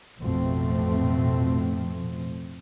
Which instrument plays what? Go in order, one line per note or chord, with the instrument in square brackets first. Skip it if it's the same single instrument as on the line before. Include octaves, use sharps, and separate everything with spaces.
[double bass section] A1 F2 B2 F3 A3 C4